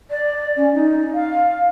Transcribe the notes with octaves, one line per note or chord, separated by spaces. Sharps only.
D5
C#4
D#4
F5